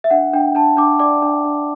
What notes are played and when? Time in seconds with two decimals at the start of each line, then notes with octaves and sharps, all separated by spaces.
0.04 E5
0.10 D4 F#5
0.33 D4 G5
0.55 D4 A5
0.77 D4 D6
0.99 D5 D6
1.22 D4
1.45 D4